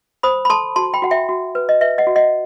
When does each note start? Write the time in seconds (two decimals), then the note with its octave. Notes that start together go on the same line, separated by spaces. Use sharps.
0.23 C5 B5 D#6
0.45 B5
0.50 A4 A5 C6
0.76 F#4 A5 C6
0.94 G5 B5
1.02 F#4 F#5
1.11 E5 G5
1.29 F#4
1.55 B4
1.69 D#5
1.81 B4 E5
1.98 D#5 F#5
2.07 F#4
2.16 D#5 F#5